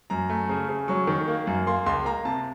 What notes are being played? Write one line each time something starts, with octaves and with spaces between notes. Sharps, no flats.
F#2 A#5
A3
C#3
C#3
F#3 C#6
D#3
A#3
F#2
A#3 C6
C#2 C6
A#3 A#5
C3 A5